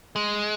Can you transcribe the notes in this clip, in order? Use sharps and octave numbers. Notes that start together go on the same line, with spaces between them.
G#3